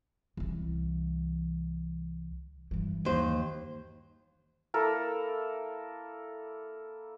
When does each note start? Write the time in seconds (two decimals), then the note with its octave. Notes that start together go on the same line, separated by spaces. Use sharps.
0.37 C2 E3
2.71 G2 E3
3.05 D#2 C5
4.74 A#3 E4 A4 A#4